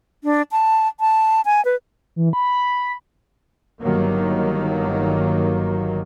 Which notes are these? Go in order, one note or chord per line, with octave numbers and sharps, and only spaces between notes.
D4
A5
A5
G#5
B4
E3
B5
G1 D#3 F#3 A#3